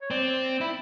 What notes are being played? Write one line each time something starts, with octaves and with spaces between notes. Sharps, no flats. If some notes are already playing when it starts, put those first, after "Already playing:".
C#5
C4 D5
E4